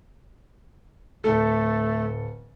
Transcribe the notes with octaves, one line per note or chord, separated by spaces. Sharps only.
D1 A3 A4